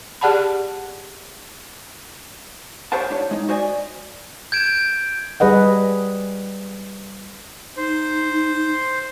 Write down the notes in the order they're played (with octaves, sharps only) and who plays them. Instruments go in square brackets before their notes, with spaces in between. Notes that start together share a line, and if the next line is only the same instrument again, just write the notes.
[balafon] G4 G#4 D5 F#5 A5 B5
[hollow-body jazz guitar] G4 A#4 C5 C#5 F#5 A5
D4 E4 C5 C#5
G#3 D#4
F#4 C5 D5 D#5 G#5
[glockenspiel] G6 G#6 D7 E7
[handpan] G3 G#4 B4 D#5 F#5
[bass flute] D#4 [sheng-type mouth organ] C5